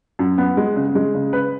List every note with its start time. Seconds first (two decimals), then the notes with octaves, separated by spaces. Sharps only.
0.19 F#2
0.38 B3
0.57 G#3
0.76 C#3
0.95 G#3
1.14 C#3
1.33 B4